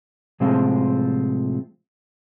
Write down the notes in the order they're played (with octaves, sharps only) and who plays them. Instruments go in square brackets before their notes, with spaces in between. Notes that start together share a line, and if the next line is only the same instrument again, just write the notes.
[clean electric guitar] A2 C3 F3 G#3 C4 F4